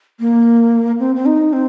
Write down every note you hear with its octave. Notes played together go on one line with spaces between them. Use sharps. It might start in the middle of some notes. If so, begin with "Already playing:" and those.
A#3
C4
C4
D#4
C4